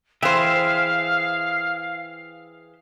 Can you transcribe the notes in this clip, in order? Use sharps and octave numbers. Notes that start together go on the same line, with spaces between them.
E3 G#4 C5 E5 F5 G5